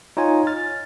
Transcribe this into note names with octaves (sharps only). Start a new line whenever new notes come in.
D#4 F4 C#5 G#5
F6 A6